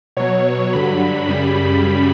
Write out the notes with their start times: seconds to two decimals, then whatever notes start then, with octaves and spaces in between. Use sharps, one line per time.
0.17 B2 F#3 C#5
0.73 G2 D3 F#3 B5
1.28 F#2 C#3 G3 B5